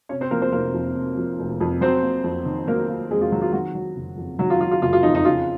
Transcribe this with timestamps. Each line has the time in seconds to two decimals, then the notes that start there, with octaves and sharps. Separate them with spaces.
0.09 C3 C#4 C#5
0.21 C4 C5
0.31 F3 A#3 A#4
0.42 C4 C5
0.52 F1 A#3 A#4
0.74 F2
0.96 C3
1.17 F3
1.39 F1
1.61 F2
1.81 F#3 C4 C5
2.02 A#3
2.24 F2
2.45 D#3
2.68 F#3 A#3 A#4
2.89 A#3
3.10 F2 G#3 G#4
3.21 F4
3.32 D#3 F#3 F#4
3.42 F4
3.53 D#3 F#3 F#4
3.75 F#3
3.96 F#1
4.17 F2
4.39 D#3 F#3 F#4
4.50 F4
4.61 F#3 F4
4.71 F4
4.82 F#1 F4
4.93 F4
5.03 F2 D#4
5.15 D#4
5.24 C#3 F4